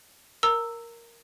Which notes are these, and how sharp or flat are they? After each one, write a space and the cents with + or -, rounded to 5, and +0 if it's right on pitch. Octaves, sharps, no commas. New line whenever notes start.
A#4 +0 A#5 -25 E6 +0